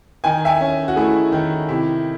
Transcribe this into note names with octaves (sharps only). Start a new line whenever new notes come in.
D#3 G#5
E5 G#5
C#4
F#4
A3 E4 G#4
D#3
C3 E4